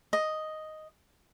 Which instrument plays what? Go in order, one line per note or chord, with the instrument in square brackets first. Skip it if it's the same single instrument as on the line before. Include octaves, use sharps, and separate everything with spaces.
[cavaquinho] D#5